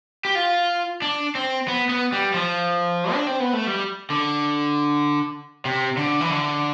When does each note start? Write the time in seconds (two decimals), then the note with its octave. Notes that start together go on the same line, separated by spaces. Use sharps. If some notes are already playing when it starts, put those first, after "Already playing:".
0.25 G4
0.35 F4
1.02 D4
1.35 C4
1.68 B3
1.89 B3
2.12 G3
2.34 F3
3.13 D4
3.27 C4
3.40 B3
3.53 A3
3.67 G3
4.10 D3
5.65 C3
5.97 D3
6.21 E3
6.31 D3